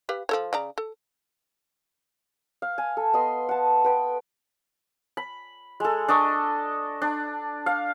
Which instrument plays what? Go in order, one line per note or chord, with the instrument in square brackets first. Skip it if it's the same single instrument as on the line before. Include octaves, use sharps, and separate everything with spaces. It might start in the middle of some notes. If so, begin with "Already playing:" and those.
[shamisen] G4 B4 F5
F3 A4 C#5
C#3 D5 A#5
A4
[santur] F5
G#5
A4
B3 D#5 C6
F#5 A5
B4 G5
B5
G#3 A4
D4 A4 D#5 C#6
D4
F5